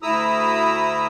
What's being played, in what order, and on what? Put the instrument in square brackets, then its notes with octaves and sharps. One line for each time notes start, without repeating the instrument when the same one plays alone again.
[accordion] D2 E4 A#5 D#6 E6